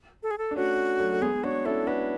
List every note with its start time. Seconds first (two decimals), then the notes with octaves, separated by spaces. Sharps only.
0.23 A4
0.31 G#4
0.38 A4
0.51 D4
0.56 A3 C#4 F#4
1.00 F#3 A3
1.13 A3
1.22 G#3 B3 G#4
1.43 D4 F#4 C#5
1.65 C#4 E4 A4
1.87 D4 F#4 B4